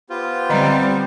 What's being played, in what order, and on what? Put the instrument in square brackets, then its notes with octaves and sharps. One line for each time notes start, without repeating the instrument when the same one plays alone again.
[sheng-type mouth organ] B3 G4 C5 [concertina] F4
[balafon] D3 D#5 A#5 [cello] G3 C4